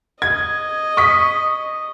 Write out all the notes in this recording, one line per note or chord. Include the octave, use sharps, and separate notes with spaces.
D#5 G#6
C#6 D#6 B6